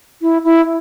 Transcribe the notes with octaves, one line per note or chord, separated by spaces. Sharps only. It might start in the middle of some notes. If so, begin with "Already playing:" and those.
E4
E4